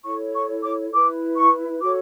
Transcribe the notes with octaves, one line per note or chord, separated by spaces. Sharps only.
E4 A4 C#5 C#6
C#6
D6
E4 B4 D6
C#6
F#4 A4 C#5 D6